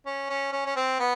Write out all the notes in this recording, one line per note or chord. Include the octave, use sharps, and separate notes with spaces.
C#4
C#4
C#4
C#4
C4
B3